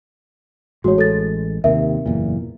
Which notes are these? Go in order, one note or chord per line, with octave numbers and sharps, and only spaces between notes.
A1 G#3 F#4 C#5
A4 A6
D#2 C3 A#4 E5
F#1 E2 A#2